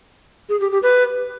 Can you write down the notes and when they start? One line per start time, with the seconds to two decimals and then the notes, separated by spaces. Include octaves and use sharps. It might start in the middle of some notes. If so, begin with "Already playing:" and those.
0.49 G#4
0.60 G4
0.72 G4
0.83 B4